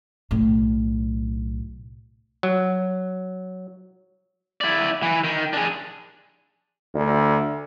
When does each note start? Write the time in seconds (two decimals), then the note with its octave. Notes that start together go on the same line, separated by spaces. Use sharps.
0.31 B1 A2
2.43 F#3
4.61 E4 D5
5.03 E3
5.24 D#3
5.53 D4 G#4
6.94 D2